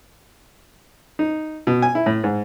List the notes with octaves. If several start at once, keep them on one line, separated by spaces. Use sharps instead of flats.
D#4
B2
G#5
E4
A2
G#2